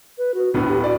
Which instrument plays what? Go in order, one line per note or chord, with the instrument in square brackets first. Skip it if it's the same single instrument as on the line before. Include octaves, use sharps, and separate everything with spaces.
[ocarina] B4
F#4
[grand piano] D1 A2 B3 [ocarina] D4
[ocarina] G4
[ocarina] F#4 [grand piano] D5